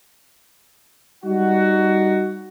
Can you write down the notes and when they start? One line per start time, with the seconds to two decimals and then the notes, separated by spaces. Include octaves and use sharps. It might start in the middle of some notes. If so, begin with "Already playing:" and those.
1.24 G3 D#4 F#4